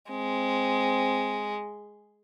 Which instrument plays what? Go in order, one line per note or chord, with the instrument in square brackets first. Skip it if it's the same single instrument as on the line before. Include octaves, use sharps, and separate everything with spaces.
[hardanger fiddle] G#3 [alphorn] C4